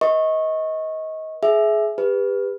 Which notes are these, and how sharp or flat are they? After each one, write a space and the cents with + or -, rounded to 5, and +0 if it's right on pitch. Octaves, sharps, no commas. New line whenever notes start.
B4 -35 D#5 +25 C#6 -20
G#4 +25 E5 +0
G4 +35 B4 +0